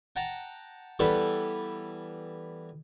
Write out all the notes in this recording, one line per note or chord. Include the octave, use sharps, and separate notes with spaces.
F#5 G5 A5 A#5
E3 G3 B3 G4 A4 B4